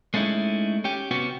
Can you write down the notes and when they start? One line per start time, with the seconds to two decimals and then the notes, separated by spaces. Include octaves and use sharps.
0.14 G#3 A3 C#4 D#4 E4
0.84 C#4 G4
1.11 C3 B3 C#4 F#4 G4